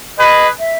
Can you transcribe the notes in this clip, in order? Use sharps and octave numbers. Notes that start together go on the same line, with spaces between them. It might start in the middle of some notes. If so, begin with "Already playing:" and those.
G#4 B4 D#5
E5